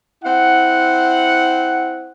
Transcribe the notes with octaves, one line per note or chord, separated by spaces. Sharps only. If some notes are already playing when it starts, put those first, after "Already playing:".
C4 E4 F#5